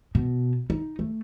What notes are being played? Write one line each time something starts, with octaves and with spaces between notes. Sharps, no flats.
B2
D#4
A3